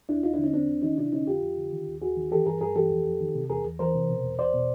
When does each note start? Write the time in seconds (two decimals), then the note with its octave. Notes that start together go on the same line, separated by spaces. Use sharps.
0.09 D#2 D4 E4
0.23 D#2 D#4 F4
0.34 D4 E4
0.39 D3
0.44 C#4 D#4
0.53 E2 C4 D4
0.68 E2
0.83 D#3 C#4 D#4
0.98 C3 D4 E4
1.13 D3 C#4 D#4
1.27 F2 F4 G4
1.42 F2
1.57 D3
1.72 D#3
1.87 D#2
2.01 D#2 F#4 G#4
2.17 D#3
2.31 E3 G4 A4
2.46 G2 G#4 A#4
2.61 G2 G#4 A#4
2.76 E3 G4 A4
2.91 F2
3.06 F2
3.20 D#3
3.35 C3
3.50 E2 G#4 A#4
3.65 E2
3.79 E3 A#4 C5
3.95 C3
4.09 B2
4.24 E2
4.39 E2 C5 D5
4.54 B2